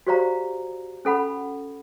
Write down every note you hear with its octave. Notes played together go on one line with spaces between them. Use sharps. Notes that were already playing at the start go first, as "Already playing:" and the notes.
F#4 G4 C5 D5 F5 A#5
C#4 A4 F#5 B5